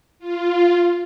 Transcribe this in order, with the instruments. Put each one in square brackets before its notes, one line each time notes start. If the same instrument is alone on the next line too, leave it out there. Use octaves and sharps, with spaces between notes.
[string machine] F4